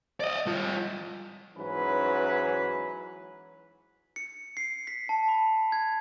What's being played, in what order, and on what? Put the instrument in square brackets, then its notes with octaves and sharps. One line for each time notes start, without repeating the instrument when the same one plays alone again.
[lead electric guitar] D5 D#5
G3 F4
[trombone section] G#2 E3 F#3 C#4 B4
[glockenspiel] C#7
C7
B6
A5
B5
G#6